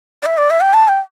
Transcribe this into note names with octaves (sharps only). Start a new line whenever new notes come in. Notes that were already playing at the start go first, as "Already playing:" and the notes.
D5
E5
D5
E5
G5
A5
G5